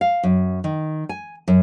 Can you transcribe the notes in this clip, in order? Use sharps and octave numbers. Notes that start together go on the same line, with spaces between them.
F5
F#2
D#3
G#5
F#2